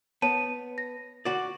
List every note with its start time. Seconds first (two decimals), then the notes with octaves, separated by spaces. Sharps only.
0.22 B3 C#5 A5 D#7
0.78 A#6
1.25 F#4 D5